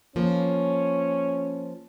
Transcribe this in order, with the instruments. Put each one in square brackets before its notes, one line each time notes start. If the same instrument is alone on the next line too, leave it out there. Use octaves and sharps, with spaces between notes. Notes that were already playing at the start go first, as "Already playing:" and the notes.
[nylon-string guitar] F3 A#3 [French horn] C#4